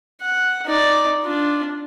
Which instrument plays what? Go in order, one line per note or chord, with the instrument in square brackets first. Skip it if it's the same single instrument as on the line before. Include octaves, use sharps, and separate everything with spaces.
[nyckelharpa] F#5
D#4 D5
D4 F4